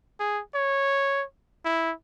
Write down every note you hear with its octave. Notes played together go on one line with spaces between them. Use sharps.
G#4
C#5
E4